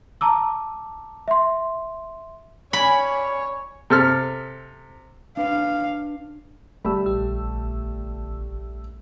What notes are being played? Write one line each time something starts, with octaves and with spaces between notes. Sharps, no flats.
A5 A#5 D6 E6
E5 C6
C#4 C#5 D5 G#5 B5
C3 A4 F6
D4 B4 F5
G1 G3 A3 B5 E6
A#1 G4 E6